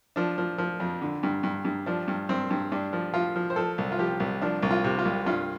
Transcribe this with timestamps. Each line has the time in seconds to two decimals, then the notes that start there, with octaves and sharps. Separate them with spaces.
0.16 F3 D4
0.38 F3
0.58 F3
0.80 F2
1.02 D3
1.23 G2
1.43 G2
1.65 G2
1.86 F3 D4
2.08 G2
2.29 G2 C4
2.50 G2
2.72 G2 D4
2.93 F3
3.14 F3 F4
3.36 F3
3.50 C5
3.56 F3 A4
3.78 C2
3.92 F4
3.99 F3 G4
4.20 C2
4.42 F3 D4
4.63 C2
4.71 F4
4.84 C3
4.99 F4
5.05 C2
5.26 G2 F4